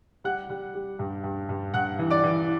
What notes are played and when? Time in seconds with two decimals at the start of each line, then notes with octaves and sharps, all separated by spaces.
0.24 G3 F#5 F#6
0.50 G3
0.74 G3
0.99 G2
1.24 G2
1.49 G2
1.74 G2 F#5 F#6
1.99 E3
2.11 D5 D6
2.23 E3